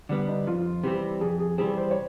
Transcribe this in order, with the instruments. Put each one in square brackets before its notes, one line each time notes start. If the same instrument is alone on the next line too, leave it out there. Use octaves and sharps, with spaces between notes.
[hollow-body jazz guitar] D3 G3 B3 [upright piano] D4
[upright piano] D#4
[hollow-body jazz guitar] F2 [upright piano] F4
[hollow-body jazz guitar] C3 E3 G3 C4 [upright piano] G4
[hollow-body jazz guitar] F2 [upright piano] G#4
[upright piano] G#4
[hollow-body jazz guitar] C3 E3 G3 C4 [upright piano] G#4
[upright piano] C5
C#5